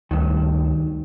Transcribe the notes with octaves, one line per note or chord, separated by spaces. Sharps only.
D2 G2 D#3